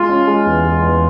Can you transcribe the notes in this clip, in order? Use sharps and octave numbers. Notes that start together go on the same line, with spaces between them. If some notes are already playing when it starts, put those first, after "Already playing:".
Already playing: G#3 F4
C#4
G#3
E2
G#3
E2